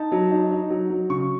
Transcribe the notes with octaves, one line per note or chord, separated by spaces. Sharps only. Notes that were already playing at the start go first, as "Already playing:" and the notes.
Already playing: D#4 A5
F#3
D#4
D#4
F#3
F#3
C#3 C#6